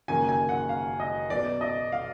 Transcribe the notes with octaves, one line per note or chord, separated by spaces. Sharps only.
F#1 F#2 D#3 A#3 G#5
G#5
F#5
F5
D#5
B1 B2 F#3 B3 D5
D#5
F5